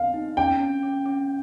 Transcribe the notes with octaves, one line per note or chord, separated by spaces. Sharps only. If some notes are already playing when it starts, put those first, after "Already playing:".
Already playing: F5
D#4
C#4 G5
C#4
C#4
C#4